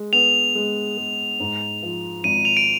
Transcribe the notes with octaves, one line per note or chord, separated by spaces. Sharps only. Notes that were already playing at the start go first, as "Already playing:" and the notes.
Already playing: G#3
B3 F7
G#3
G#3
G#2
F3
G#1 D#7
F7
D7